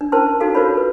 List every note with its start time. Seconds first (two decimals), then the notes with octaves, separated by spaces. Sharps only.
0.01 D4
0.12 C#4 E4 A#4 C5 A5 C6
0.40 D#4 F#4 A4 F5
0.54 F4 F#4 A#4 C5 C#5 B5
0.77 B4